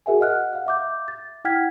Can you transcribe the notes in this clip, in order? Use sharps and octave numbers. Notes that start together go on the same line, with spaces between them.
F#4 G#4 A#4 E5 F#5 G#5
D#5 F#5 F6 F#6
F5 F#5
E5 D6 G6
A6
E4 F#5 G5 F6 G#6 B6